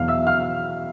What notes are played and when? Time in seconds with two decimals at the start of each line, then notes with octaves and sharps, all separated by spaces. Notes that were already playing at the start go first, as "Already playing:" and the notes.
Already playing: E2 B2 F#3 F5 F6
0.08 E5 E6
0.27 F5 F6